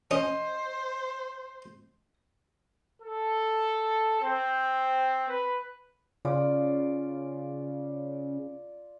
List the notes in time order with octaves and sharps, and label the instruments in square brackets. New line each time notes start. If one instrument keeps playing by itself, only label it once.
[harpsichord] C#4 [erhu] C5 [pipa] D#5
[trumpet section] A4
C4
B4
[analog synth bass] C#3 [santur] F4 D5